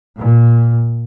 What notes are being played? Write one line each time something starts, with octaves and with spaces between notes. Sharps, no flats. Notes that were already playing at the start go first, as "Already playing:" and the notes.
A#2